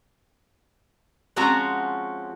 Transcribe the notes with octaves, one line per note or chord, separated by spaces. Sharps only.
F3 G#3 C4 C#4 F#4 A#5